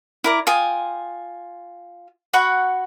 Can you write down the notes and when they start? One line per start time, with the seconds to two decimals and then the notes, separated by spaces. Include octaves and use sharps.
0.24 E4 A#4 D5
0.47 F4 G5 G#5 D#6
2.33 F#4 F#5 B5 C#6